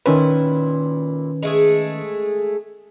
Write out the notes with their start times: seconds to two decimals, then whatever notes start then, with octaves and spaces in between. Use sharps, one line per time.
0.06 A#2 D#3 C#4 E4 B4
1.43 G#3 A3 G#4